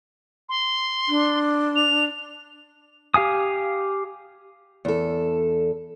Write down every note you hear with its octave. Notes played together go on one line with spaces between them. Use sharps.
C6
D4
F7
G4 F5 G#5 D#6
E2 A4